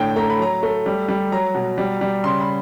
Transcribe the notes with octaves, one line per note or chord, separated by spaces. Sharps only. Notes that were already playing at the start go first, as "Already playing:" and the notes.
Already playing: A2 D3 G5
A3 A#5
B5
F#3 A#5
A3
G3
G3
F#3 A#5
B2
G3
G3
C#3 C6
B5